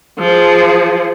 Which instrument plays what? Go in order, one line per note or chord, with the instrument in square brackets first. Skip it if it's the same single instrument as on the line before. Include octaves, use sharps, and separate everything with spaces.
[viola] F3 G#4